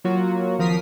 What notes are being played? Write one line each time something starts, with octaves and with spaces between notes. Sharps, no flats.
F#3 A#3 F4 F#4
G#1 F3 A#4 D#6 B6 C7